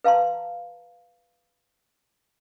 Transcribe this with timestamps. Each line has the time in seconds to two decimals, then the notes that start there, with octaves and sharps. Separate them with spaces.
0.04 B4 F5 A5 A#5 C6